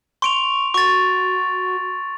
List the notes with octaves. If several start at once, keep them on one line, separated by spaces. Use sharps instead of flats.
C6 C#6 D7 F7
F#4 C#6 A6